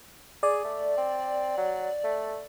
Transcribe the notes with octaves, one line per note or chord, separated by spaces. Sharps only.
G#4 D5
A3
C4
F#3
A3